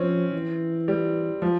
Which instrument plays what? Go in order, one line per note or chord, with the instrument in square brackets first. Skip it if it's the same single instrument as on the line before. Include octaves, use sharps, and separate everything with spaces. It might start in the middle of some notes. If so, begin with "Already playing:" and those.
Already playing: [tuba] F3 [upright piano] C4 C#4
[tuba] E3
[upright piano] G3
F3